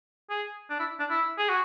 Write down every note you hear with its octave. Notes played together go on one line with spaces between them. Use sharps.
G#4
D4
E4
D4
E4
G#4
F#4